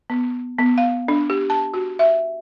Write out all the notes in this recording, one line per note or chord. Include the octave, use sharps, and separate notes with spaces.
B3
B3
F5
D4
G4
A5
F#4
E5